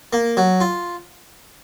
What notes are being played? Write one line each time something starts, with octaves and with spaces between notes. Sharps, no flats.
A#3
F#3
F4